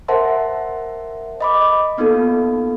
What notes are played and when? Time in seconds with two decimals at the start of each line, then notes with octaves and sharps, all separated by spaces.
0.08 A#4 C5 E5 F#5 A5 C6
1.41 D#5 B5 D6
1.98 A#3 B3 D#4 F4 A4